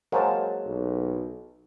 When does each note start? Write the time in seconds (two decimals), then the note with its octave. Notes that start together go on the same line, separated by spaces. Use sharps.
0.12 F#3 G#3 A#3 A#4 C5 A5
0.66 B1